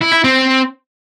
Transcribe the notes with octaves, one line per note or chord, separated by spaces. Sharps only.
E4
E4
C4